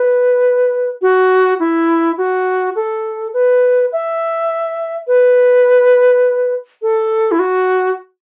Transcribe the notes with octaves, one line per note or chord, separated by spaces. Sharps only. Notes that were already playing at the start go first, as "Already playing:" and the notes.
Already playing: B4
F#4
E4
F#4
A4
B4
E5
B4
A4
E4
F#4